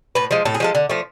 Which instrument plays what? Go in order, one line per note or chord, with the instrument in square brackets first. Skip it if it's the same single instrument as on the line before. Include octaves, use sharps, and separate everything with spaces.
[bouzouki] A2 B4
F3 G#3
A2 A4
G#4
F3 G#3 A4
D3
F3 A3